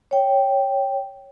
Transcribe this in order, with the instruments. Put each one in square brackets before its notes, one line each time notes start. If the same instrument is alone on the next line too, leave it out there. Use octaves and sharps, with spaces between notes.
[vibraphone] C#5 G5